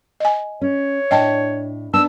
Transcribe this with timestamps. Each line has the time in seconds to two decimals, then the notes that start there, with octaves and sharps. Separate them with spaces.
0.20 D#5 G#5
0.61 C#4 C#5
1.11 A2 D4 D#5 G5 A5
1.94 B3 D4 D#4 A5 E6